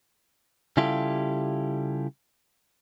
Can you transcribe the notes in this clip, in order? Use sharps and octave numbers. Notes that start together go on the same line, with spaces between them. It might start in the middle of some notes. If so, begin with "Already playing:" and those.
C#3 G3 E4 F4 G4 A4